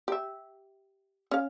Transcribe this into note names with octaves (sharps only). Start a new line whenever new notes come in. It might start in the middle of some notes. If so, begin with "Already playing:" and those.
G4 E5
C#4 F5